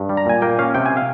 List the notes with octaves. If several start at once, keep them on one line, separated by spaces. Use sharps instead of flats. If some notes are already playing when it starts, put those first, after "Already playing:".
Already playing: G2
G3
A#5
A#2 G#5
A#3 G5
C#4 F5
C3 G5
G#5
F5